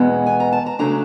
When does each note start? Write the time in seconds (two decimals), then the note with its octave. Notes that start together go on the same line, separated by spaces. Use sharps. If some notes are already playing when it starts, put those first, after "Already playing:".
Already playing: E2 B2 G#3 B3
0.26 G#5
0.40 A#5
0.53 A5
0.66 A#5
0.79 C#3 F#3 A3 D4 A#5